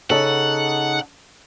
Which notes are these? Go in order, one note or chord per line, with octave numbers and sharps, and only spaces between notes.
C#3 D#4 A4 F#5